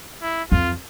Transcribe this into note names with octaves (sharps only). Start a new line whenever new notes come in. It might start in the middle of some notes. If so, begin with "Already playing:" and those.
E4
F2 F4